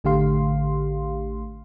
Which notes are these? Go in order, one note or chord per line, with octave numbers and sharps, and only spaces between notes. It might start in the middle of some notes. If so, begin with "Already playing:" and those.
A1 D3 A3 G4 F5 C6